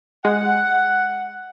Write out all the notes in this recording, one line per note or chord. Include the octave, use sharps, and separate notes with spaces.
G#3 F#5